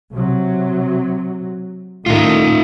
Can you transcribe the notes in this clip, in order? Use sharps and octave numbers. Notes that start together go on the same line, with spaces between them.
C3 F#3
A2 D#3 A3 D#4 F4